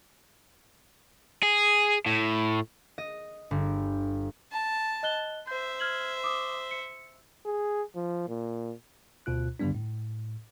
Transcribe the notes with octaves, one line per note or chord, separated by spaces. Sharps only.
G#4
A2
D#5
G1
A5
D#5 F#6 G7
C5 E5 G6
F6 G#6 F#7
D6 D#6
C#7
G#4
F3
A#2
D2 B2 F4 F#6
G2 D3 D#3 G3 B3 D4
A2